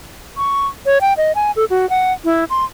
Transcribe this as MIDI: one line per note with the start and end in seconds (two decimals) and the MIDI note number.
0.37 0.67 85
0.86 0.98 73
1.01 1.14 79
1.17 1.32 75
1.35 1.51 80
1.56 1.65 69
1.70 1.89 66
1.90 2.12 78
2.25 2.44 64
2.50 2.64 84